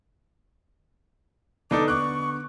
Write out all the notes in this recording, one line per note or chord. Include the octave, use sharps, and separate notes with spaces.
D3 B3 D4 D#4 A4 D6
C#6 D6 F#6